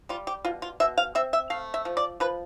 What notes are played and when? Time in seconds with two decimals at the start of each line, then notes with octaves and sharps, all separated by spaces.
0.09 G3 F4
0.27 G4
0.45 B2 F4
0.62 F4
0.80 B2 E5
0.98 F5
1.15 C4 E5
1.33 E5
1.50 A3 F5
1.74 E5
1.85 F3
1.97 D5
2.20 F3 B4